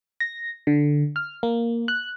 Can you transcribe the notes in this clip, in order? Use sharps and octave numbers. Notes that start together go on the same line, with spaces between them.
A#6
D3
F6
A#3
F#6